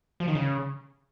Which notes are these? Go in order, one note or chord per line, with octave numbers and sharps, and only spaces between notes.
F3
D#3
C#3